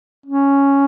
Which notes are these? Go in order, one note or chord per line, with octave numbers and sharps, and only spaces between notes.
C#4